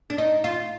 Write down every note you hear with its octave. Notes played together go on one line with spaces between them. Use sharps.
D4
D#4
F4